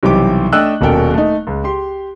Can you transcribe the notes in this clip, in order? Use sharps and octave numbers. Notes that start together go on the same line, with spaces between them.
B1 C3 E3 G3 G4 D6
A3 D4 D#5 G5 E6 F#6
D#1 B2 C#4 A4 A#4 G5
A3 D#4
C#2
G4 C6